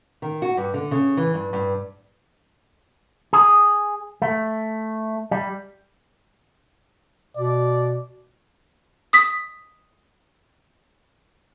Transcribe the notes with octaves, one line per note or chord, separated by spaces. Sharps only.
D#3
F#4
G2
D3
C#3
E3
G2
G2
G#4
A3
G3
B2 D5
D#6 B6